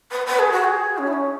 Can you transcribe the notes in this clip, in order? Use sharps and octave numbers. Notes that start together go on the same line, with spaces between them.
B4
B4
G#4
F#4
G#4
C#4
E4
C#4